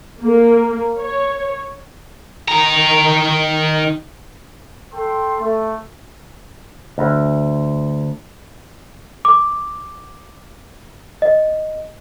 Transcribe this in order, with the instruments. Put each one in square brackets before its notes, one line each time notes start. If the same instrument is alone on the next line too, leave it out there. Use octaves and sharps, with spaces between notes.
[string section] A#3
C#5
[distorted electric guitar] D#3 A#5
[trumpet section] A4 G5 C6
A3
[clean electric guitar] D2
[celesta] D6
D#5